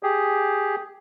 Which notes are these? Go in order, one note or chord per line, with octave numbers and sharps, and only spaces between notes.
G4 G#4